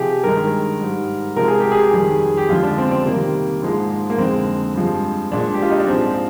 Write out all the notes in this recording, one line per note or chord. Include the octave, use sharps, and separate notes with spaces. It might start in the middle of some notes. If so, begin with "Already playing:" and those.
Already playing: C3 F3 G4 G#4
G2 D#3 G#3 A#4
G#2 G3
C3 F3 G#3 A#4
G#4
G4
G#4
F2 D#3 G3
G4
F2 D3 F3 G#3 F4
D4
C4
C4
C3 D#3 G3 A#3
G#2 F3 G#3
A#3
F2 D3 G#3 C4
G2 F3 G#3
A#2 F3 G#3 D4
G4
F4
D#4
D4
G#2 F3 G#3 C4